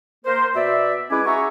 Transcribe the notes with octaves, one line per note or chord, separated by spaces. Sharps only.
A#3 A#4 C5
B2 F#4 D5 E5
G#3 C#4 E4 B4 G#5 D6
F#4 G#4 E5 G#5 A#5 C#6